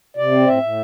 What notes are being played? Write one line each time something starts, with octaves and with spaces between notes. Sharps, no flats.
C3 D5
C4
A2 E5
A2